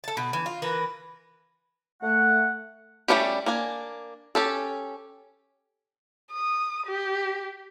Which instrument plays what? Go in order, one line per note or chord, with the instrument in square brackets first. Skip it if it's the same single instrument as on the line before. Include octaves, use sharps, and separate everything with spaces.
[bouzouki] A4 A5
B2
E3
F4
E3 A#4 B4
[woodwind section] A3 F#5
[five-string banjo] G3 A3 A#3 C#4 G4
A#3 D4 G#5
C#4 G4 A4
[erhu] D#6
G4